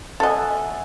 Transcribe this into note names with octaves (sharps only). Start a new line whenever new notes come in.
A4 D#5 E5 F#5 G#5